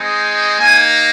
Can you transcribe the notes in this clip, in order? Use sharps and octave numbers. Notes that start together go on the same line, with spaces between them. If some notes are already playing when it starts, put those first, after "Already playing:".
Already playing: G#3 C4 D#4
A#3 D#4 G#5